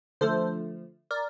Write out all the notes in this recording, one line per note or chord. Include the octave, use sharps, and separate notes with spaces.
D3 F3 A3 A4 C5
A#4 D5